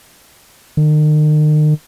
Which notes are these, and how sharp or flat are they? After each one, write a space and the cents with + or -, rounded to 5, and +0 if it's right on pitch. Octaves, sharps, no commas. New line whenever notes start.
D#3 -40